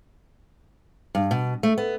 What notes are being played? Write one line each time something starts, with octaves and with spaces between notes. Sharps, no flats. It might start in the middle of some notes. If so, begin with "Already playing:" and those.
G2
B2
A3
B3